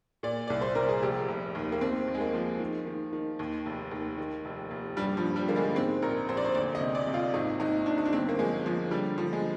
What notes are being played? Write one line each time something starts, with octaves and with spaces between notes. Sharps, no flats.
A#2 D5
C2 D5
C5
C2 A#4
G#4
F1 G4
F1
D#2
A#3
D#2 C4
D#2
G#3
A#3
F3
D#3
D#3
D#3
D#2
F1
D#2
D#3
F1
F1
G2 G3
F3
G2
G3
D3 A#3
G#3
G#2 C4
A#1 A#4
A#1 C5
D5
C5
D2 D5
D#5
C3
D5
C3
F4
G#1 D#4
G#1 D#4
G#2 D4
D#4
D4
G1 C4
A#3
F3 G#3
F3 G#3
D3 G3
D3 F3
G#3